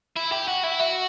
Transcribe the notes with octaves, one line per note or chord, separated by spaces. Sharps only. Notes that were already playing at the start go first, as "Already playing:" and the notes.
E4
G4
F#4
E4
F#4